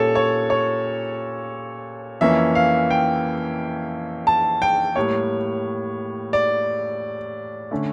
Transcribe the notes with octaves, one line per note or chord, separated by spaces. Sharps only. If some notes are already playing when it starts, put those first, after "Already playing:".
Already playing: A#2 G3 C#4 A4 C#5
C#5
C#5
F2 E3 A#3 C#4 E5
F5
G5
A5
G5
A2 G3 A#3 C#5
D5
D3 A3 C#4